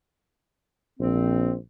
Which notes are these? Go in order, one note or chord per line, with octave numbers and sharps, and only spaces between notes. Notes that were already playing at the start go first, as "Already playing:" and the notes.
A#1 C4